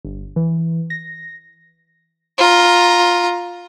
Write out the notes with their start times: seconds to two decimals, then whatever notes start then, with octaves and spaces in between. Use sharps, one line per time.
0.05 G1
0.36 E3
0.90 A#6
2.38 F4 A#5